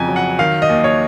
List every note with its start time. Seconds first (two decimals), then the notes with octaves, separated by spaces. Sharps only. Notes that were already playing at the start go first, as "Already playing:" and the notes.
Already playing: F2 C#3 G#5 A#5
0.08 F#3
0.16 F#5
0.39 D#3 F5
0.62 D#5
0.69 D#2
0.84 C#5